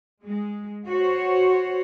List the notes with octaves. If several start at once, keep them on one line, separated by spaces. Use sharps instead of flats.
G#3
F#4 C5 C#5